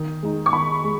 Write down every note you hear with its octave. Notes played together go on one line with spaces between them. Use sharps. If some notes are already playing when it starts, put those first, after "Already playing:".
Already playing: D#3
G#3 D#4
C#6
D#3 B5
G#3